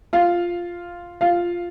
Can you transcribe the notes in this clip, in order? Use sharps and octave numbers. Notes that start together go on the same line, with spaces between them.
F4 F5
F4 F5